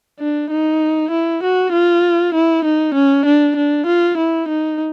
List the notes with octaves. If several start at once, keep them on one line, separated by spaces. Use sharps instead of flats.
D4
D#4
E4
F#4
F4
E4
D#4
C#4
D4
D4
F4
E4
D#4